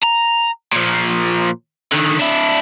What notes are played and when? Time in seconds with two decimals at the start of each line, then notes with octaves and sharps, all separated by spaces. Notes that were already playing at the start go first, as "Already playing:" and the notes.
0.03 A#5
0.72 A#2 F3
1.92 D3 D#3
2.19 D4 E4